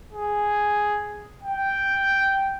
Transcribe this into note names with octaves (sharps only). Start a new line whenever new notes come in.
G#4
G5